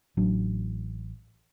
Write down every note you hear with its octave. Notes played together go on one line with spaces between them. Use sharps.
A1 F#3 D4